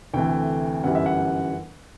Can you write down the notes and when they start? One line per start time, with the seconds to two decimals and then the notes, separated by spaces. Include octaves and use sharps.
0.14 D2 C3 E3 A3 G5
0.83 G1 F#2 E3 G3 F#5
0.95 E5
1.06 F#5